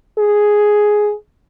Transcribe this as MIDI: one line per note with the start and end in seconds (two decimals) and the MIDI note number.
0.18 1.14 68